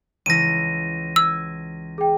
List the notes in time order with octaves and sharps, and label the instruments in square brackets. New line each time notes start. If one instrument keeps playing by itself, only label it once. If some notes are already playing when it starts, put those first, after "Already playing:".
[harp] C#2 E3 E4 [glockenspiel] A#6 D#7
[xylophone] E6 [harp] G#6
[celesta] G#4 G5